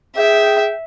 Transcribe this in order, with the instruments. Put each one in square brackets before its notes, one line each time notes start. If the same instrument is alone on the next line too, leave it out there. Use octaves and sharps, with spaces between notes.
[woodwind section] G#4 G5 [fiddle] E5